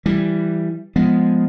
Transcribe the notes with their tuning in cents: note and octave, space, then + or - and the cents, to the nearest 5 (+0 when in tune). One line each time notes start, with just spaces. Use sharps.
E3 +10 G3 +0
F3 +0 G#3 +0 B3 +0